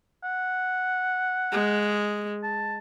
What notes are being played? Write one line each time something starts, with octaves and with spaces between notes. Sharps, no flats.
F#5
G#3
A5